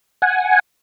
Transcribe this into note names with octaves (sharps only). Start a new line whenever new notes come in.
F#5 G#5